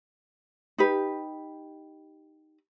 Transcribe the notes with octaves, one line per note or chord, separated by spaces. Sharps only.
D#4 G4 B4